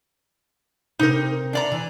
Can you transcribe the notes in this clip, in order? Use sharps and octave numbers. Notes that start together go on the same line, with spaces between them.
C3 D#4 G4 A#4
D4 D5 A#5
E3